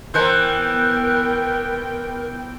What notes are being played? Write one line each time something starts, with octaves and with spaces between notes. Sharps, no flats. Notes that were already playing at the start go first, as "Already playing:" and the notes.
E3 B3 A#4 C5 F#5 G5 A#5